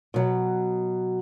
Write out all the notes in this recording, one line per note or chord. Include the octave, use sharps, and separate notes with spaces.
B2 F#3